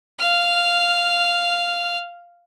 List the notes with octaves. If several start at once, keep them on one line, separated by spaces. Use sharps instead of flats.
F5 F6